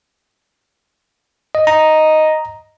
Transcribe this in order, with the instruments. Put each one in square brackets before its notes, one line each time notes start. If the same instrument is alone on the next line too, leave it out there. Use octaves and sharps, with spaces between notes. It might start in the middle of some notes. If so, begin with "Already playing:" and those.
[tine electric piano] D#5
[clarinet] D#5 [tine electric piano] A#5